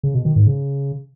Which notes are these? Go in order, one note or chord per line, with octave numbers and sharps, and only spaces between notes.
C#3
B2
D#3
G#2
C#3